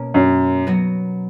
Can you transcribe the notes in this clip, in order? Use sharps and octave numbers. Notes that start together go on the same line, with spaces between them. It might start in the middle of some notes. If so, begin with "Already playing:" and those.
Already playing: B2 A#3 C#4 A#4
F#2
F#3 B3 F#4